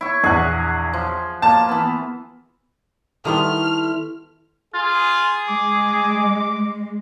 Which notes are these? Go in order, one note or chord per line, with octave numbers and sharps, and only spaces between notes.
E4 C#6
A#1 E2 G#4 F#5
F3
A#3 F4 A5
E3 B3
D#3 G3 A3 B3 E4 C6 F6
F4 G#4
G#3 D6